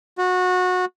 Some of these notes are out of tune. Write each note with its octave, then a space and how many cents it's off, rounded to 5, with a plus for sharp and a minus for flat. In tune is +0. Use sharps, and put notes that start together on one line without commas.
F#4 -20